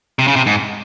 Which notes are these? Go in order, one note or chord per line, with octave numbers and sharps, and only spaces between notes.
C3
C#3
C3
G#2